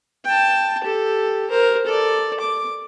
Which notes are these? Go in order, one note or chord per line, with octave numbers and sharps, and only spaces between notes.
G5 A5
G4 A4
A#4 C5
A4 D5
D6